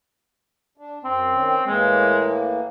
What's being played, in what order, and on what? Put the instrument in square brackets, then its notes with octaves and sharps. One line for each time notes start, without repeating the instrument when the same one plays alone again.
[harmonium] D4
[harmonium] F#2 [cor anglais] C4
[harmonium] D#3 C#4
[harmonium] A2 E3 A#3 [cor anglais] G#3